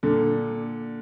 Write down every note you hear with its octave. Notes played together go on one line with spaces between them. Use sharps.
A#2 D3